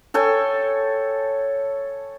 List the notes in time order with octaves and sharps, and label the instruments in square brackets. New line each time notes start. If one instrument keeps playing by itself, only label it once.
[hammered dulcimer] A4 C#5 G5 G#5